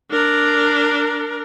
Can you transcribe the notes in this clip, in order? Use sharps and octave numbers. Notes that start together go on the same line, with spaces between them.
D4 A#4